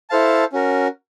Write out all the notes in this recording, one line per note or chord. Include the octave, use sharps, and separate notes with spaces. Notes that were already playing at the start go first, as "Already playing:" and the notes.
E4 A4 C5 F5 A5
C#4 F#4 A#4